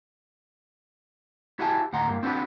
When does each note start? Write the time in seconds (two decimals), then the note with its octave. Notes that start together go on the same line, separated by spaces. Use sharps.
1.59 E4 F#4 G4 E5 G#5 A5
1.93 D2 A2 F#5 A#5 C6
2.08 G2 A#3
2.23 C4 D4 F#4 B4